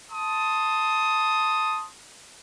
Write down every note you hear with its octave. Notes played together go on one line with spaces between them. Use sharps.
A5 C6 D#6